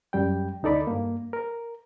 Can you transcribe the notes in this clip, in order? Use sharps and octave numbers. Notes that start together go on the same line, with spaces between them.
F#2 G3 G5
D2 D#4 A4 D5 B5
G2 A#3
A#4